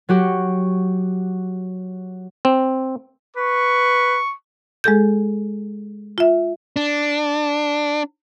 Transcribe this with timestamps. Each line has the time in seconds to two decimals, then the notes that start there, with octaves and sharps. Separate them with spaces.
0.09 F#3 F#4 G4
2.45 C4
3.36 B4 C#6
4.84 G#3 G#4 A4 G6
6.18 F4 E5
6.76 D4